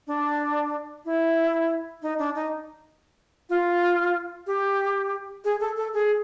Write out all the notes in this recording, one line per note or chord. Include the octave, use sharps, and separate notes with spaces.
D4
E4
D#4
D4
D#4
F4
G4
G#4
A4
A4
G#4